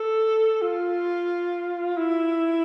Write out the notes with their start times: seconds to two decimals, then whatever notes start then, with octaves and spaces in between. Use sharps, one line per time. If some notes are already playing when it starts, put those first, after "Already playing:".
Already playing: A4
0.62 F4
1.97 E4